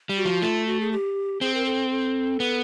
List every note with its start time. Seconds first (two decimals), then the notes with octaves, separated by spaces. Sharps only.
0.09 G3
0.17 F#4
0.25 F3
0.42 A3 F4
0.67 F#4
0.81 G#4
0.92 G4
1.41 C4 G#4
1.54 A#4
1.66 A4
1.90 A4
2.40 B3